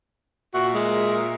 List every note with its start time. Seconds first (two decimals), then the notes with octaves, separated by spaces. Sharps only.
0.54 A#2 F#4 A#4 E5
0.74 G#3